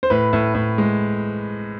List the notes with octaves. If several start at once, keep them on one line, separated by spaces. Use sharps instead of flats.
C5
A2 B4
A2
A2
G#3